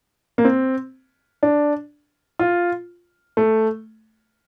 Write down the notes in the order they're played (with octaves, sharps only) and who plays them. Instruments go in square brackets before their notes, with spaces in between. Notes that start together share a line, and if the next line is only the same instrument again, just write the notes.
[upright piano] A#3
C4
D4
F4
A3